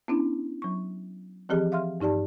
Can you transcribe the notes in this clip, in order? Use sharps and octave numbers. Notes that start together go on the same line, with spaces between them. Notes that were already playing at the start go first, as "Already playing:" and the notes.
B3 C#4 D4 E4
F#3 C#6
E3 F3 C4 G4 G#4 D#5
E5 F5 C6 F6
G2 D#4 G4 D5 A5